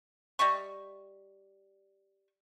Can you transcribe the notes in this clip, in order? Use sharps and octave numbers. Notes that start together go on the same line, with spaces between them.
G3 D#5 E5 C#6